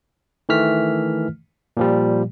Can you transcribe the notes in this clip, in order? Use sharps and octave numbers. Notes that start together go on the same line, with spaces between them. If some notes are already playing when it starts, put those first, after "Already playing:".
D#3 E3 A3 F6 B6
A#2 F3 G3